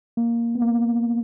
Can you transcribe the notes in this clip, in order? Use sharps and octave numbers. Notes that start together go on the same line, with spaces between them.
A#3
B3
A#3